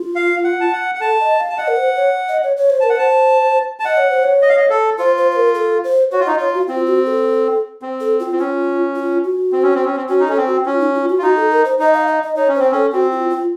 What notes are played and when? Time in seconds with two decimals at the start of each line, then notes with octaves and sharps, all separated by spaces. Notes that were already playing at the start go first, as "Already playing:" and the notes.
Already playing: F4
0.16 F5
0.44 F#5
0.61 A5
0.73 F#5
0.95 F#5
1.00 A4 A5
1.20 D#5
1.39 F5
1.49 A5
1.58 D#5 F#5
1.68 A#4
1.77 C5
1.96 C#5
2.29 D#5
2.43 C#5
2.57 C#5
2.70 C5
2.80 A#4 A5
2.90 F#5
2.96 C5 A5
3.80 A5
3.85 D#5 F#5
3.97 C#5
4.10 C5
4.23 C#5
4.42 D#5
4.49 F5
4.57 D#5
4.70 A4
4.99 F4 C5
5.17 C5
5.32 C5
5.36 A#4
5.55 A4
5.84 C5
6.12 F#4 C#5
6.20 F4
6.26 D#4 D#5
6.36 F4 C#5
6.54 F#4
6.68 C4 F4
6.87 F#4
7.06 A4
7.82 C4
8.01 A4
8.20 F4
8.32 C4
8.39 C#4 F4
8.96 F4
9.24 F#4
9.52 C4
9.63 C#4
9.74 C4
9.85 C#4
9.96 C4
10.09 C#4 F#4
10.20 D#4
10.28 C#4 A4
10.37 C4
10.47 F#4
10.66 C#4 F4
10.80 D#4
10.95 F4
11.09 F#4
11.18 F4
11.23 D#4 F#4
11.36 A4
11.51 A#4
11.65 C5
11.79 D#4 D#5
11.94 F5
12.08 D#5
12.23 D#5
12.36 D#4 C#5
12.48 C#4
12.55 C4 C5
12.72 C#4 A4
12.93 C4 F#4
13.12 F4
13.30 F4